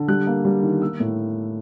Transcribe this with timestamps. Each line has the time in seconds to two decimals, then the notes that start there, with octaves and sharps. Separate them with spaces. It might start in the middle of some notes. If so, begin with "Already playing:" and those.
Already playing: D3
0.08 G3 F#6
0.27 A#3
0.45 G3
0.63 D#3
0.81 A#3 E6
1.00 A2